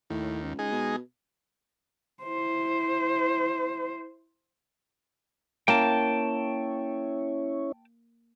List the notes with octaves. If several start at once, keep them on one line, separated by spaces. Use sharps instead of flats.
D#2 A2
C#2
G#3 D#4 G#4
B2
E4 C5
A#3 C#4 E4 C#5 G5 A5